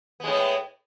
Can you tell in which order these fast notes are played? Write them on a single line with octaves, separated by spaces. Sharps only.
B3 G#3 A2